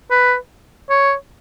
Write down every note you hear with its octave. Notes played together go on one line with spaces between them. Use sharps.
B4
C#5